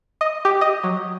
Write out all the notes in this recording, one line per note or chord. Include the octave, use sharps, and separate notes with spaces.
D#5
G4
D#5
F#3